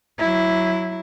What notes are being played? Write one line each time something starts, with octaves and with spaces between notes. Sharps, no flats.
F#3 E4